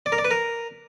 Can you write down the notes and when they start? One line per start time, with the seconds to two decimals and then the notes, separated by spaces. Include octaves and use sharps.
0.06 D5
0.12 A#4
0.18 D5
0.25 B4
0.31 A#4